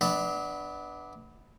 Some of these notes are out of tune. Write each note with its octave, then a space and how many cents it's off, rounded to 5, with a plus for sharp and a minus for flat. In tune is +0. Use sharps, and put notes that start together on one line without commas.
B3 +0 D4 +0 E5 -40